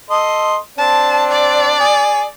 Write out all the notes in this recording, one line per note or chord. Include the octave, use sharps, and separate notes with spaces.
A4 D#5 C6
C4 D4 A5
D5
G#4